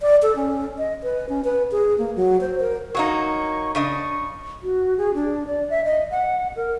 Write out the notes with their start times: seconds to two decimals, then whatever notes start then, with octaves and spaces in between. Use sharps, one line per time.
0.02 D5
0.22 A4
0.36 C#4
0.78 D#5
1.03 B4
1.29 C#4
1.45 B4
1.72 G#4
1.98 A#3
2.16 F#3
2.41 C5
2.60 A#4
2.95 F#3 A#3 D#4 C#6
3.75 C#3 D4 D#5 C#6
4.63 F#4
4.98 G#4
5.14 D4
5.48 D5
5.70 E5
5.85 D#5
6.11 F#5
6.56 A#4